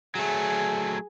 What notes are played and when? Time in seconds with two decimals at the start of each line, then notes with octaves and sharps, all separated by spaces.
0.15 F#3 A3 G#4